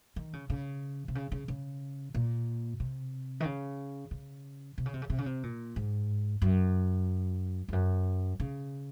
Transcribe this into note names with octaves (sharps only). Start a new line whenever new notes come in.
D#3
C#3
C#3
C3
C#3
C#3
C#3
A#2
C3
D#3
C#3
C#3
C3
C#3
C3
C#3
C3
C#3
C3
A#2
G#2
F#2
F2
F#2
C#3